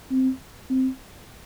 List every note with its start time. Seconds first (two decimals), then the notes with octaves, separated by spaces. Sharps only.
0.11 C4
0.70 C4